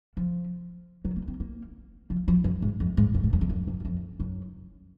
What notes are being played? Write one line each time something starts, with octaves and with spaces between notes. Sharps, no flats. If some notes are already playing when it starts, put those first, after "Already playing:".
F3
F#3
A#3
C4
A#3
F3
F3
F#2
G#2
F2
G#2
F#2
G#2
F#2
F2
F#2
F#2
F#2
F2
F#2